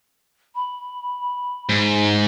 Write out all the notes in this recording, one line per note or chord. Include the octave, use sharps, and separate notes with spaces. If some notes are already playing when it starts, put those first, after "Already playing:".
B5
G#2